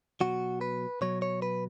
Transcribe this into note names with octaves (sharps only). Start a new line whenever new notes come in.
B2 F#3 F#4
B4
B2 F#3 C#5
C#5
B4